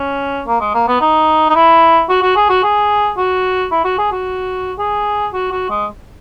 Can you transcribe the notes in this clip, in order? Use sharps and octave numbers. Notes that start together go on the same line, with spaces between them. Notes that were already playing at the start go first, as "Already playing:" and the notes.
Already playing: C#4
A#3
G#3
A#3
B3
D#4
D#4
E4
F#4
F#4
G#4
F#4
G#4
F#4
E4
F#4
G#4
F#4
G#4
F#4
F#4
G#3